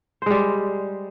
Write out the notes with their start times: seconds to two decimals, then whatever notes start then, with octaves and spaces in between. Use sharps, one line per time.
0.22 C5
0.26 G#3
0.31 G3